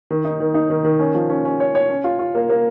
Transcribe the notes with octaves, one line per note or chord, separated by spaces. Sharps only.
D#3
D#4
D#3
D#4
D#3
D#3
C#4
F3
C#4
C#4
C#5
C#5
C#4
F4
F4
A#3
A#3